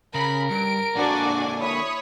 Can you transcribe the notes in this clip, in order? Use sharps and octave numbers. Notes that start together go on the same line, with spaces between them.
C#3 A#4 B5
G2 D7
D3 A#3 D4 F#4 D5 G#5
E4 C#5 B5 D#6